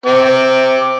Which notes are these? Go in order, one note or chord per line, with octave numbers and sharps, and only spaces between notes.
C4 D6